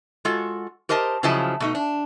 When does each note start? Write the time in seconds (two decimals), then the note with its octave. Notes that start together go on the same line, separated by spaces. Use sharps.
0.25 G#3 F4 F#4 A4
0.89 G4 A#4 C5 D#5 A5
1.23 C#3 F3 F#3 E4 D#5 A5
1.60 B2 A3 D#4
1.75 D4